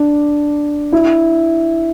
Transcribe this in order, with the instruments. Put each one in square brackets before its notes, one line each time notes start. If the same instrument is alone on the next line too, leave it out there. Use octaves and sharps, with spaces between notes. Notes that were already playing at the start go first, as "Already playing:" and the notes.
Already playing: [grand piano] D4
E4